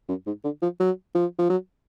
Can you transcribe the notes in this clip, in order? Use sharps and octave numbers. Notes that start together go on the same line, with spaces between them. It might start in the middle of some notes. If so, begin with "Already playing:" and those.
F#2
G#2
D3
F3
F#3
F3
F3
F#3